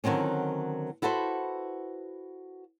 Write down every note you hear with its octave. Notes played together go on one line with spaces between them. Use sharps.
D3 D#3 F#3 C4 C#4
E4 F#4 A4 B4 C5